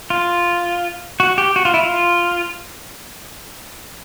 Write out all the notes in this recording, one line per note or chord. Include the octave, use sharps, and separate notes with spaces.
F4
F#4
G4
F#4
F4
E4
F4